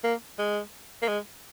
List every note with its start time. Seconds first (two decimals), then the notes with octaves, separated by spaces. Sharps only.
0.04 A#3
0.39 G#3
1.02 A#3
1.08 G#3